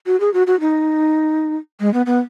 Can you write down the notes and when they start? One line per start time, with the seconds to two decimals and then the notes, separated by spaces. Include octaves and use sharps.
0.06 F#4
0.20 G#4
0.34 F#4
0.47 F#4
0.60 D#4
1.80 G#3
1.94 B3
2.06 B3